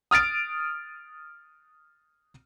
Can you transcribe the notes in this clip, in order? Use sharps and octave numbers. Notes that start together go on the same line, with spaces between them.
D#6 F6 A6 D7